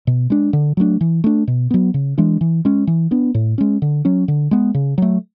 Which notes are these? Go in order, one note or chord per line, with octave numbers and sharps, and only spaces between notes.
B2
G#3 D4
D3
F#3 A3 D4
E3
A3 D4
B2
F#3 B3
C#3
E3 G#3 D4
E3
G#3 C#4
E3
B3 D4
A2
G#3 C#4
D3
F#3 C#4
D3
G#3 B3
C#3
F#3 A3